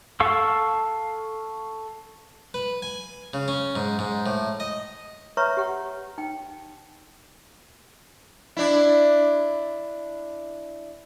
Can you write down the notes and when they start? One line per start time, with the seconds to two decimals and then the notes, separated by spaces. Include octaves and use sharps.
0.20 A4 F5 C#6 E6
2.54 B4
2.82 G#5
3.33 C#3
3.48 C#4
3.76 G#2
3.99 G#2
4.26 A2
4.60 D#5
5.37 B4 C#5 E5 A#5 C#6
5.57 G4 F#5
6.18 D#4 G5
8.57 D4 E4